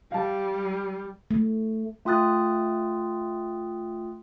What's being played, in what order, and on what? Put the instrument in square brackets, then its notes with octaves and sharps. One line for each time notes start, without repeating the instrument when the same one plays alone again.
[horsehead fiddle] G3 [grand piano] F5 A5
[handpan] A3
[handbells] A3 F4 G5 D#6 F#6 A6